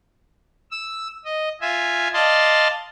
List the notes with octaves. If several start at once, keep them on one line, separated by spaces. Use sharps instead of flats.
E6
D#5
F4 E5 G#5
D5 D#5 F5 A5 C6